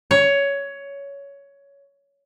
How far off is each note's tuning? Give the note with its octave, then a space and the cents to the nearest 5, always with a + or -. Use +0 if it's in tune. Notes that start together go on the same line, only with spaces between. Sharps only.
C#5 +15